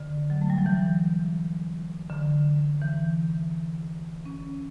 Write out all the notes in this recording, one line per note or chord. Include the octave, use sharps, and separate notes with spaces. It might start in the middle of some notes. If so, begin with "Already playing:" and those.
Already playing: D3
F#3
A3
G3
F#3
E3
D3
E3
C#4